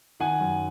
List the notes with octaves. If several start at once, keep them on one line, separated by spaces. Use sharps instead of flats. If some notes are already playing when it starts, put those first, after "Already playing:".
D#3 F#5 G#5
F#2